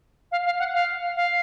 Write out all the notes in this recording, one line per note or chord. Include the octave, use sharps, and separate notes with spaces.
F5
F5
F#5
F5
F5